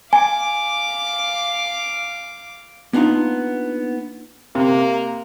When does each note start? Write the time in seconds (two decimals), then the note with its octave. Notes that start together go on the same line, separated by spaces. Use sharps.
0.13 F5 G#5 D6
2.93 A#3 B3 D4 D#4 F4
4.55 C3 A#3